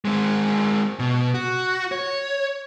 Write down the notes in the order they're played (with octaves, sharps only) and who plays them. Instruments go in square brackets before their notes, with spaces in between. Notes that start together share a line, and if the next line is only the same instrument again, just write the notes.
[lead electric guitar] G#3 C4
B2
F#4
C#5